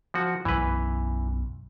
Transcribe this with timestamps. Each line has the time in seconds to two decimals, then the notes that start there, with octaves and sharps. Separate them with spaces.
0.14 F3 F#4
0.45 B1 F#2 E3 B4